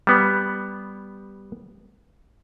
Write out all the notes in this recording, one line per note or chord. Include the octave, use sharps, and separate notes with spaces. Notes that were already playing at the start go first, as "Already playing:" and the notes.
G3 B3